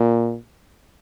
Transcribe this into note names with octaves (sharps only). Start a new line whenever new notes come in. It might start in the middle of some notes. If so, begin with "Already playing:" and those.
Already playing: A#2